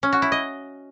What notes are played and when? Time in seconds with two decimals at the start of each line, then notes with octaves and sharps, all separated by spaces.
0.03 C#4
0.13 F#4
0.22 E4
0.32 D#5